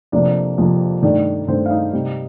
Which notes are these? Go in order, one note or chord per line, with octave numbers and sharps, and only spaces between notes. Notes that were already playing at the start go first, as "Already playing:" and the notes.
F2 C3 F3 A#3 D4 D5
F2 C3 F3 A#3
G2 D#3 A3 D4 D5
G2 D#3 A3 C4 C5
F5
D#4 D#5
C3 G3 C4